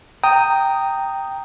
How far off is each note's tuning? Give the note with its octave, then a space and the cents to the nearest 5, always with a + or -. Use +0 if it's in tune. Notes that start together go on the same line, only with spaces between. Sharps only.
G5 +0 A#5 -15 D#6 +0